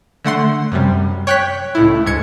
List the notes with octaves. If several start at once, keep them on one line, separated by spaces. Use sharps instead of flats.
D3 A3 F#5 C6
F#2 C3 G3
C#5 G5 F#6 G6 B6
C#2 A2 E4
D2 G#2 G#6 C#7